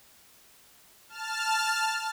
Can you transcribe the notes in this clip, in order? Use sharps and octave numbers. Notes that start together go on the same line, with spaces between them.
A5 F6